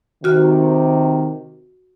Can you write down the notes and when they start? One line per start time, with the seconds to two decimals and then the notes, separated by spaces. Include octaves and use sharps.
0.24 C3 D#3 F#4 F6